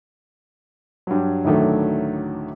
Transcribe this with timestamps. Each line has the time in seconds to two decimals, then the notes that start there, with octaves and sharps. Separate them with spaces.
1.07 G2 F#3
1.45 D2 A2 D3 D#3 F#3 A3